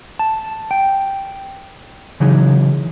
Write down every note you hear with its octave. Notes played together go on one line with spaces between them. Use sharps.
A5
G5
C#3 E3 F#3 D#4 G#4